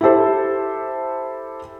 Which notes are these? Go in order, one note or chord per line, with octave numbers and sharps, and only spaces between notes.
E4 G4 A4 C5